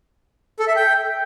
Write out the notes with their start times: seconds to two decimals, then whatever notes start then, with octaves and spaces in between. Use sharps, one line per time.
0.59 A4
0.68 E5
0.76 G5